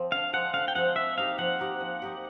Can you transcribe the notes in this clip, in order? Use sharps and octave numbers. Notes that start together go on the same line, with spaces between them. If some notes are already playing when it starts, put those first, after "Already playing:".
Already playing: F3 C4
D3 F5
F3 G#3 C4 F#5
D3 F5
G5
F3 G#3 C4 F#5
F3 E5
A#3 D#4 G4 F5
F3 F#5
A#3 D#4 G4
F3
A#3 D#4 G4